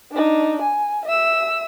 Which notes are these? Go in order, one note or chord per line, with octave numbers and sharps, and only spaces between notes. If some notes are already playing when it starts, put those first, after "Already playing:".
D4 D#4
G#5
E5 E6